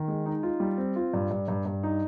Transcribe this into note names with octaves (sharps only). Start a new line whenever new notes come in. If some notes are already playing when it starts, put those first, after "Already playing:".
Already playing: D#3
G#3
D#4
F4
G3
C4
F4
G2
G2
G2
G2
D#4